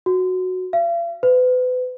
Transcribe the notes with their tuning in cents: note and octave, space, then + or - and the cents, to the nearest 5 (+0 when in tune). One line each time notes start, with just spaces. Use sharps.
F#4 -5
F5 -40
B4 +35